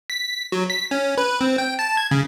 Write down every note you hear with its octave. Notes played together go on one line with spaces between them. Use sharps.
B6
F#3
B6
C#4
B4
C4
G5
A5
G#6
C#3